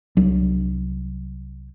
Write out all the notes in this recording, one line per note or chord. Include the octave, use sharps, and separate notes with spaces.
C2 F#3 D4